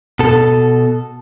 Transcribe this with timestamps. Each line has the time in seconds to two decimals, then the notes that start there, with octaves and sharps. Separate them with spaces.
0.19 B2 A4